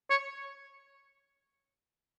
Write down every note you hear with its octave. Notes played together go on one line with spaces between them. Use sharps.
C#5